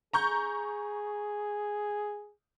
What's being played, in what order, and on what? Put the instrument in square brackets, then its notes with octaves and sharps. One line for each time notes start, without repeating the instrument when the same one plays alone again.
[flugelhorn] G#4 [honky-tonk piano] A#5 C#6 G6